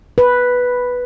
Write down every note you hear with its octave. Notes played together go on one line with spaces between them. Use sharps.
B4